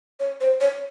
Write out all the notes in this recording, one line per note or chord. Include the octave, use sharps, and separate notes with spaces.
C#5
C5
C#5